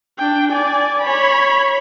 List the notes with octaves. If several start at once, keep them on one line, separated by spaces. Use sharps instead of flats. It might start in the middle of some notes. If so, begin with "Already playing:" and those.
D4 G5
D5 G#5
C#5 B5